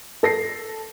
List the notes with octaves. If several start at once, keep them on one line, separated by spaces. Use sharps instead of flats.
A4 A#6 C7